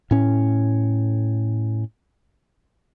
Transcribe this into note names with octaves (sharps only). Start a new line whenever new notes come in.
A2 C#4